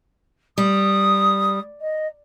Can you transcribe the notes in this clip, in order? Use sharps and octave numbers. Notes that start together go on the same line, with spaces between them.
G3 D#6
D#5